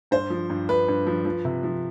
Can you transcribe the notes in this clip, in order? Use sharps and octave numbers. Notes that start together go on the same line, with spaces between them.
G2 C5
F3
G2
G2 B4
G2
F3
F3
C3
F3